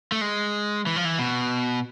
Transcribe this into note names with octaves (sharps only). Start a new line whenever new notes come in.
A3
G#3
E3
F3
E3
B2